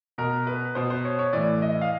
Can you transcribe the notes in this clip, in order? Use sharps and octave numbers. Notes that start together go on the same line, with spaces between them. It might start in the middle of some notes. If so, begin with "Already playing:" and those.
B2 A#4
B4
B2 C5
C5
C#5
C#5
A2 E3 D5
D#5
F5